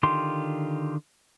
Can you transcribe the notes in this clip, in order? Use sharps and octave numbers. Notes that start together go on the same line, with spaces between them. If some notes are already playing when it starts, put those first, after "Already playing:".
D3 D#3 F4 G4 C6